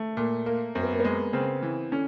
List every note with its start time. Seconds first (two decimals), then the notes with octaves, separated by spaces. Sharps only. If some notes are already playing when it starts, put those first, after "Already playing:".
Already playing: A3
0.17 A#2 A#3
0.46 A#3
0.75 F#2 C4
0.83 B3
0.91 A#3
1.00 G#3 B3
1.33 C#3 C4
1.62 E3
1.92 D3 C#4